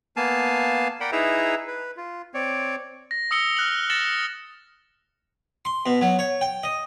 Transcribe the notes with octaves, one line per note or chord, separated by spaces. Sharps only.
A#3 B3 F5 G#5 A5
A#4 D5 F#5 G5 B5
D#4 E4 G#4 B4 E5 A#5
B4
F4
C4 C#5 D5
A#6
D#6 E6 C#7 G7
F6 F#6 F#7
A6 A#6 C#7 E7 F#7
C6
B2
F#3
C#5
G5
D#5